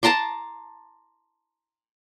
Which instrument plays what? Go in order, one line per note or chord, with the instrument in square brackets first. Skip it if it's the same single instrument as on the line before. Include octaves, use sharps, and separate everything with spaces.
[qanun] A5 A#5 C6 D6